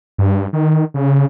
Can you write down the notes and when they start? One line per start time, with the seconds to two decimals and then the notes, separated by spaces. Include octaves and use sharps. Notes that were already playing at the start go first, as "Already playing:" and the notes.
0.18 G2
0.53 D#3
0.94 C#3